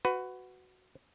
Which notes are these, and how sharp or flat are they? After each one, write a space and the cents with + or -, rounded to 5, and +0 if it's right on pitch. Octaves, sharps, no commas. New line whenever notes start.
F#4 +0 B4 +20